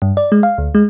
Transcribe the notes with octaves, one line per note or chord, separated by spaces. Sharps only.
G2
D5
G#3
F5
D2
G#3